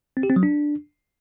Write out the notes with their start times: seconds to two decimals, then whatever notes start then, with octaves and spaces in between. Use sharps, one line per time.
0.17 C4
0.23 G4
0.30 C4
0.36 F#3
0.43 D4